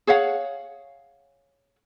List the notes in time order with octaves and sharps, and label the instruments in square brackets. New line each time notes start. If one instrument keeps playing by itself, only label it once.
[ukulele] G#4 C#5 F5 F#5